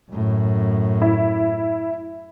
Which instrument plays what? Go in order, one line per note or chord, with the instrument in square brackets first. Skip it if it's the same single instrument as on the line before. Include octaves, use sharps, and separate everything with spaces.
[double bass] F#2 A2
[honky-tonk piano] E4